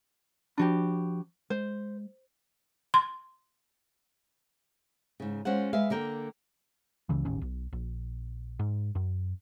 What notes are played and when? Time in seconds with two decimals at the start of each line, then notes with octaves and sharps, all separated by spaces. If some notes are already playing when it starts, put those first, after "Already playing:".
0.58 F3 D4 F#4 G4 B5
1.50 G#3 C5
2.94 C6
5.20 G#2 C#3
5.45 G#3 C#4 F4 C5 F#5
5.73 G#3 B4 E5 F5
5.90 D3 A#3 A#4 G5
7.09 C#2 C#3 E3
7.25 D#1 A1 D#2 C#4
7.42 B1
7.73 A#1
8.59 G#2
8.95 F#2